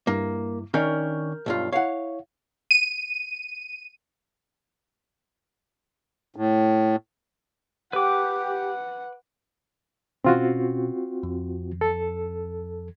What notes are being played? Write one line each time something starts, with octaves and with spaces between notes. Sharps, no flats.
G2 A#3 E4
D#3 C#4 D4 A#4 F6 G6
B1 G2 F4
E4 C#5 F5 F#5
D#7
A2
G4 B4 F#5 D6
B2 C4 C#4 F4 F#4
F2
A4